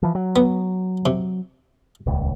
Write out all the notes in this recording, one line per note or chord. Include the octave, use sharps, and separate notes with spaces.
E3 F3
F#3
B3
C3
D#1 C#2